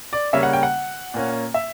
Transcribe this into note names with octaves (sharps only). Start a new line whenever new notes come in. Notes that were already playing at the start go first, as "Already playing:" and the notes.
D5
C#3 G3 A#3 C#4 E5
F#5
G5
F#5
A#2 A#3 C#4
E5